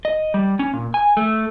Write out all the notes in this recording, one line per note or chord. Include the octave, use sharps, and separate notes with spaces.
D#5
G3
C#4
A#2
G#5
A3